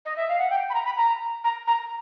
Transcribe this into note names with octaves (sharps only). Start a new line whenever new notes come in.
D#5
E5
F5
F#5
G5
B5
A#5
B5
A#5
A#5
A#5